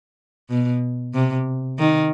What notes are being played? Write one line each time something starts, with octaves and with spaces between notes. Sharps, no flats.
B2
C3
D#3